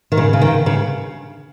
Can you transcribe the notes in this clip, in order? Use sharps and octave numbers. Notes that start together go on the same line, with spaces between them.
D#3
C#3
C#3
D#3
C#3